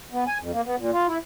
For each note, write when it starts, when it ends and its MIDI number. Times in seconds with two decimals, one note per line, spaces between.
0.12 0.24 59
0.27 0.38 80
0.40 0.51 41
0.53 0.61 58
0.65 0.76 59
0.78 0.91 46
0.93 1.07 65
1.07 1.18 64